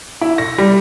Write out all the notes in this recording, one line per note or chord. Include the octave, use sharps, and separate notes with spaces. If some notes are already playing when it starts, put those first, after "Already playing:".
E4
A#6
G3